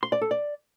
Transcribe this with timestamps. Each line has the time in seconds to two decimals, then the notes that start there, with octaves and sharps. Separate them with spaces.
0.03 C6
0.12 D5
0.21 A4
0.31 D5